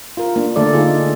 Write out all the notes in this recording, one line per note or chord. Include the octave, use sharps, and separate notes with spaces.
F4 A#4
A#3 D4
D3 A3 A4 D5
A3 D4 D#4 F4 G#4